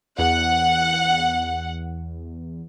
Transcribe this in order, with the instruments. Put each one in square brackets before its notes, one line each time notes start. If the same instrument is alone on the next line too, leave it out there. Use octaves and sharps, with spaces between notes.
[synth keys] E2 [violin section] F#5